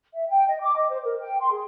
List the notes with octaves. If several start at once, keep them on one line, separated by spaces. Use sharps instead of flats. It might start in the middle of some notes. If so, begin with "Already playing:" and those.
E5
G5
D#5
D6
D#5
C5
A#4
G5
C6
G#4